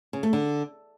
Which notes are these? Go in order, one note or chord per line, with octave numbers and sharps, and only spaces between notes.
C#3
A3
D3